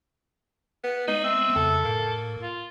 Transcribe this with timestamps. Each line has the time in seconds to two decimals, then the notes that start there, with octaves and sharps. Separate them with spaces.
0.83 B3
1.08 G#3 B3 D#4
1.24 C4 E5
1.56 F2 C#3 A4
1.85 A2 A#3
2.41 F4